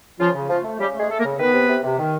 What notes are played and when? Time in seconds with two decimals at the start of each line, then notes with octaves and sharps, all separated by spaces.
0.20 C#3 F3 F4
0.35 C#3
0.50 F3 A3 F4
0.65 A3
0.80 C#3 G3 G4
0.95 A3
1.00 G#3 G#4
1.10 A3 A4
1.20 A#3 A#4
1.24 C#3
1.40 D#3 B3 B4
1.54 C3
1.69 C3
1.84 C3
1.99 D#3